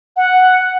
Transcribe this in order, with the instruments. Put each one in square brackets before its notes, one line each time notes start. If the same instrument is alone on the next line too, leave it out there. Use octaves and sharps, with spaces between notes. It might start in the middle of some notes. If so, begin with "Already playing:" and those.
[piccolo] F#5